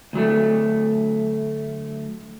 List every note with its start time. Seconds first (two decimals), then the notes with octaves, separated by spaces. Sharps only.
0.13 D2 F#3 A3